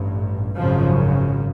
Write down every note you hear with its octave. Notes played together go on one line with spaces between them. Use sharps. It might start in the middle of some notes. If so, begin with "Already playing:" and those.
Already playing: A1 G2
G#1 F#2 C#3 F3